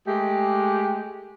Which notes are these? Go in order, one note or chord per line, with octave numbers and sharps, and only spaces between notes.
G#3 A3 G4